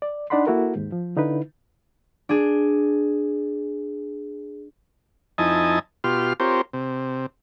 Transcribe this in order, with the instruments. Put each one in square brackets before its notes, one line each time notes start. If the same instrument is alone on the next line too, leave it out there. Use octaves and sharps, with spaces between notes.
[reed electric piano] D5
D4 D#4 D5 F#5 B5 C6
A#3 E4 F#4 A4 A#4
D#2 G#2
F3
D3 D#4 E4 B4
[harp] D4 G#4
[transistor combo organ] F2 D#4 E4 D#5 G#5 A5
B2 F4 G4 C6 F6
C4 F4 G4 A#4 C5 C#5
C3